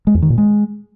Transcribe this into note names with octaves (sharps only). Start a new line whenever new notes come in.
G#3
E2
D#3
A#2
G#3